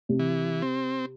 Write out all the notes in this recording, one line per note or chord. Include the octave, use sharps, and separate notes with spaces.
C3
E3
C4